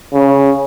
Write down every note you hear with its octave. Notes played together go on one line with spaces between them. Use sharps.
C#3